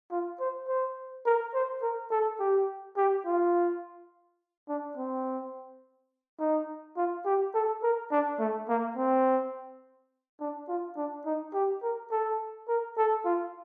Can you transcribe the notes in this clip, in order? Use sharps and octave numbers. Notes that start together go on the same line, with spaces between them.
F4
C5
C5
A#4
C5
A#4
A4
G4
G4
F4
D4
C4
D#4
F4
G4
A4
A#4
D4
A3
A#3
C4
D4
F4
D4
D#4
G4
A#4
A4
A#4
A4
F4